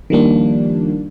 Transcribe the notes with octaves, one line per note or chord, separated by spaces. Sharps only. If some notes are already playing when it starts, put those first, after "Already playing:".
D#3 F3 G3 A#3 D4